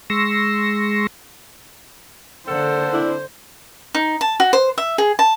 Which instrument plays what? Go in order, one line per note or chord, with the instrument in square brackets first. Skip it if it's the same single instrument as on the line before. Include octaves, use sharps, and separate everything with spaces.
[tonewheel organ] G#3 C6 C#6 E6 A#6
[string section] D3 [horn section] A#3 A4 F#5 [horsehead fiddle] C5
[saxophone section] C4 D4 E4
[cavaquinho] D#4
A5
F#4
C5
E5
G#4
A5